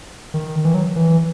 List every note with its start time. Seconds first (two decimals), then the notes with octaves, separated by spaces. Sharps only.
0.34 D#3
0.65 E3
0.74 F#3
0.96 E3